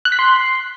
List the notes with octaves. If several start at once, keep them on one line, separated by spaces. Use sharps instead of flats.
F#6
B6
C6